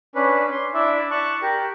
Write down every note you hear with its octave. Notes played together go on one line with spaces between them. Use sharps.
C#4 D4 B4
C6
D4 E4 D5 E5
A5 C#6 F#6
G4 A#4